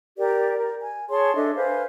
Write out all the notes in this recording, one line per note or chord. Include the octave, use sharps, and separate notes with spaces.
G4 A#4 D5
A#4
G#5
G#4 C#5 A5 C6
D4 A4 D#5 E5
B4 C5 F5 G#5